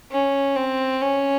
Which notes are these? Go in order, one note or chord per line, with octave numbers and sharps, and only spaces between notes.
C#4
C4
C#4